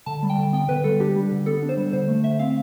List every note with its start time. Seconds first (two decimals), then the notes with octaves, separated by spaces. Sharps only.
0.06 D3 A5
0.23 G3
0.30 G5
0.38 D3
0.53 B3 G5
0.68 D3 B4
0.84 G3 A4
1.00 D4 G4
1.16 G3
1.31 D3
1.46 B3 A4
1.62 D4
1.69 C5
1.77 G3
1.93 D3 C5
2.08 A3
2.23 D3 E5
2.39 C4 F5